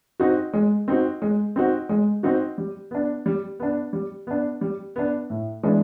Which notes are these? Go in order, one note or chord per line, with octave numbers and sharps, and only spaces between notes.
C4 D#4 F#4
G#3
C4 D#4 F#4
G#3
C4 D#4 F#4
G#3
C4 D#4 F#4
G3
B3 D4
G3
B3 D4
G3
B3 D4
G3
B3 D4
A2
E3 G#3 B3 D4